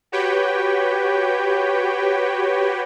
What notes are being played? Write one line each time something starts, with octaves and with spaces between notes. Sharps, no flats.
F#4 G4 B4 C#5 G5